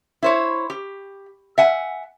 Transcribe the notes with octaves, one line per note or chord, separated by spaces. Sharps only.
E4 C5 C#5
G4
E5 F#5 G#5